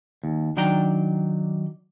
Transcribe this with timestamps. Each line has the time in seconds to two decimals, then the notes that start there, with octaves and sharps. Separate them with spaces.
0.23 D#2
0.57 D#3 F#3 D4 D5 G5 A#5